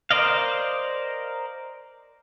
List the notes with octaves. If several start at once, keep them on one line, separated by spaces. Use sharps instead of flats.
A#4 C5 D5 D#5 F5